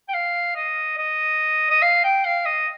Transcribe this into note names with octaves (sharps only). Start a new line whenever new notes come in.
G5
F5
D#5
D#5
D#5
F5
G5
F5
D#5